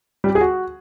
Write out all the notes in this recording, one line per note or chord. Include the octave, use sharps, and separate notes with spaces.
G3
G4
G#4
F#4